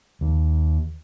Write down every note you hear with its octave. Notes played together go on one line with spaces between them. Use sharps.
D#2